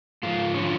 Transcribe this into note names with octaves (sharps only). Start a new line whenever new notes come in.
G#2 F3 F4
D3 F3 C#4